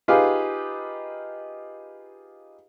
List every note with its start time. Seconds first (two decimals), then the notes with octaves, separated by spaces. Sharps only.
0.08 D#4 F4 G4 G#4 B4 F5